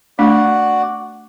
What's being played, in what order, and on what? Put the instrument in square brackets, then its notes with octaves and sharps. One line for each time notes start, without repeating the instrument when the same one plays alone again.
[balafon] A3 D4 [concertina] F#4 D5 F#5